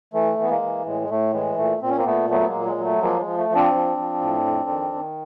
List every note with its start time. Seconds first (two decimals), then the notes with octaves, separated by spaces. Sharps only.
0.14 E3 A3
0.38 E3 B3
0.50 G#3 A#3
0.62 E3
0.86 A2 G#3
1.02 G#3
1.10 A2 A3
1.33 E3 G#3
1.58 A#2 A3
1.82 A#2 C4
1.90 C#4
1.97 A#3 C4
2.06 A#2 A3 B3
2.30 F#3 A3 B3
2.40 B3
2.48 G#3 A#3
2.54 A#2
2.66 G#3
2.78 F#3
2.84 A3
3.02 F3 G#3 A#3
3.20 G#3
3.26 F3
3.38 A3
3.50 F3
3.55 C4 D4
3.74 F3
3.98 F3
4.21 A2
4.45 F2
4.69 D#3
4.94 D#3